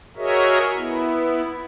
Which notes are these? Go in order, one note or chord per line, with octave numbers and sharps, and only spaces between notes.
F#4 G#4 A#4 C#5 D#5 E5
B3 E4